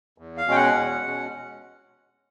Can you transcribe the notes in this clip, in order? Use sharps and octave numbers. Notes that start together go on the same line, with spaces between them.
E2
F5
B2 G#3 C#4 G5
F#5
E2
B2 G#3 C#4